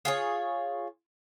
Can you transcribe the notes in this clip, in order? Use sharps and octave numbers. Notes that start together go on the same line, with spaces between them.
F4 G#4 C#5